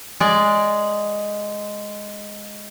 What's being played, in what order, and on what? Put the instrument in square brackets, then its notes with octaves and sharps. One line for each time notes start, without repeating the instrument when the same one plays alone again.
[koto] G#3 D5